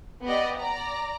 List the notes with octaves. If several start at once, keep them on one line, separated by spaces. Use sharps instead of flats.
B3 G4 D5 D#5
D5 A#5